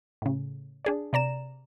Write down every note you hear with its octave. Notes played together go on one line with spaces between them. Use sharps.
A2 C#3
D4 G#4 D5
C3 D5 A#5 E7